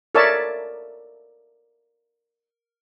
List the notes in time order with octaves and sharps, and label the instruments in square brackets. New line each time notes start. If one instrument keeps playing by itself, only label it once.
[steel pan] A4 A#4 C#5 D5 E5 A5